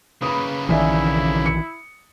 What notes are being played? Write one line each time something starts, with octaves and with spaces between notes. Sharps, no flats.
C#3 A#3 B4 B5 D#6
A#1 D#3 E3 E4 D5 E5 G#5
C#7